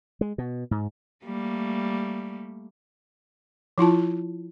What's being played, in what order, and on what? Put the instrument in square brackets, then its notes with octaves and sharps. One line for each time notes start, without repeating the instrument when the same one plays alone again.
[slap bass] G#3
B2
G#2
[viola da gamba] G3 A3 A#3
[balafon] F3 E4 F4 A5